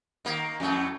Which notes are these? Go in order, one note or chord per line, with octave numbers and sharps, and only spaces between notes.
D#3 A#3
F2 A2 A3